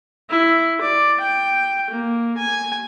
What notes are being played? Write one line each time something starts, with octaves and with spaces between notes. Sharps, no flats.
E4
D5
G5
A#3
G#5